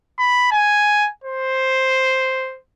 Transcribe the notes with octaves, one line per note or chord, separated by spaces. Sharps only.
B5
G#5
C5